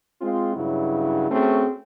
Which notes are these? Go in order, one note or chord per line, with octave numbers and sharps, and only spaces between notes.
G#3 C4 F4
G2 C#3 F#3 E4
A3 C4 C#4 F#4 G#4